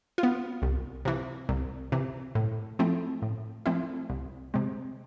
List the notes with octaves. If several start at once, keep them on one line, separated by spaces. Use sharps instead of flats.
F4
B3
C2
C3 E3
C2
C3 E3
A2
F3 A3 C4 E4
A2
F3 A3 C4 E4
C2
C3 G#3 C4